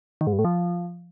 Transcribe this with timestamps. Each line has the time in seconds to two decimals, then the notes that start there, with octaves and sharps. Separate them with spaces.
0.21 D#3
0.27 G#2
0.33 G2
0.39 A2
0.45 F3